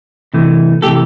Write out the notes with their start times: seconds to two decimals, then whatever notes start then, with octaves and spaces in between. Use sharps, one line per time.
0.34 C3 E3 A3
0.82 C3 E3 A3 G4 A4